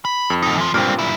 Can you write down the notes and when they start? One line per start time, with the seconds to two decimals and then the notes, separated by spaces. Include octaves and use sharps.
0.05 B5
0.30 F2
0.42 D2 D#4
0.57 E3 F3
0.74 G2 A#2 A#3 C4
0.99 F#2 E4